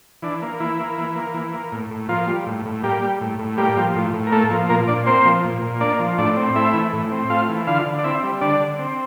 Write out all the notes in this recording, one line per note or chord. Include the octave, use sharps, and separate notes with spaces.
E3 D4
A#3
E3 E4
A#3
E3
A#3
E3
A#3
A2
A2
F3 A#3 F4
G3
A2
A2
G3 A#3 G4
G3
A2
A2
G3 A#3 G4
F3
A2
A2
A#4
A3 A#3 A4
F3
A#2 A#3 A#4
A#2 D4 D5
A#3 C4 C5
F3
A#2
A#2
A#3 D4 D5
F3
A2 D4 D5
C4
A3 E4 E5
E3
A2
C4
A3 F4 F5
E3
D3 F4 F5
D3
D5
C4 E4 E5
G3
D3 D4 D5
D3
C4